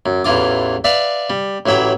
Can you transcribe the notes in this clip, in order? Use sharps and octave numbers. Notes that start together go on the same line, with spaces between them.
F#2
A1 E2 E3 F4 D6
B4 D5 E5 F5
G3
A1 E3 F#3 E5 G5